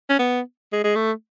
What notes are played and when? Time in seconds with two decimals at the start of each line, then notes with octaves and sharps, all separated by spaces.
0.10 C#4
0.19 B3
0.73 G#3
0.84 G#3
0.95 A3